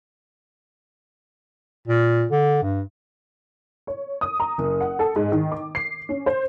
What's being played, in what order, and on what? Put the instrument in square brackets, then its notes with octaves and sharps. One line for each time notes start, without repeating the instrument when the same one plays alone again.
[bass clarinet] A#2
D3
G2
[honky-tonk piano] C#5
D#6
A#5
F#1
F#5
A4
G#2
D#3
D6
C7
C#4
C5